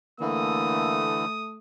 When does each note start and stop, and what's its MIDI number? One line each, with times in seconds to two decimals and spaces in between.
0.20 1.25 50
0.20 1.25 52
0.20 1.59 57
0.20 1.06 58
0.20 1.58 87